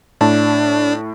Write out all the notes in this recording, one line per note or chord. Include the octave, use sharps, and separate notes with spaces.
A2 D4 A5